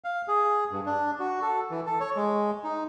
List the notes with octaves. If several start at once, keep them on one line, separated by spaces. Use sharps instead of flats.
F5
G#4
G2
D4
F#4
A4
E3
A4
C#5
G#3
D#4